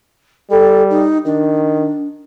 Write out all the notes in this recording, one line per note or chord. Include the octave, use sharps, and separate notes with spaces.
G3 A4
D#4
D#3 D4